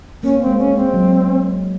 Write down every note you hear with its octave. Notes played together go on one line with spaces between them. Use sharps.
A#3 C#4
C4
G#3
C#4
G#3
C4
F#3